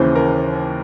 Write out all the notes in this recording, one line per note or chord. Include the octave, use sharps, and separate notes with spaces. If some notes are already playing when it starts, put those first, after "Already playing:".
Already playing: D#2 C#3 E3 C5
A#4